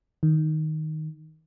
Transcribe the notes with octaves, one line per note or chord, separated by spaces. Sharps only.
D#3